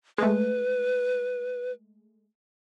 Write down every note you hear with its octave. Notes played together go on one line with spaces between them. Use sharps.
G#3 A3 B4